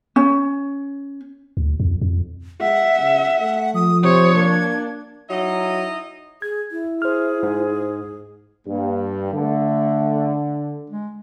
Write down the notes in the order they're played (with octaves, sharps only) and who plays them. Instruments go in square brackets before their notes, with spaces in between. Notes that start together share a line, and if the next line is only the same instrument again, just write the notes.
[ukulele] C#4
[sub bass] D2
F2
F2
[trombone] G#3 [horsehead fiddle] E5 [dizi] F#5
[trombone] C#3
A3
[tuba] F3 [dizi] D#6
[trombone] C3 [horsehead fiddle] C5 C#5 [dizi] D#6
[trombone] A#3 [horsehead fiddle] D4 [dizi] G#6
[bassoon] F#3 [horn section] D#4 E4 D#5
[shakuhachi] G#4 [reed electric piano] G#6
[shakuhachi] E4
[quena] G#4 [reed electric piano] C5 F6
[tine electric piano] G#2
[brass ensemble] G2 [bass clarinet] A#3
[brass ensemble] D3 [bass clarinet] A3
[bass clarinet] G#3